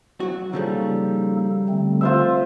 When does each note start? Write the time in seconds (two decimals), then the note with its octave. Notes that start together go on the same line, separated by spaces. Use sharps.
0.20 F#3 F#4
0.53 C#3 F3 G3 A#3 D#4 A4
1.69 D3 A3 C4
2.01 F4 C5 E5